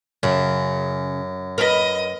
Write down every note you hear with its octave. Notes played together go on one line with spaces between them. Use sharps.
F#2 C#3
A#4 B4 D#5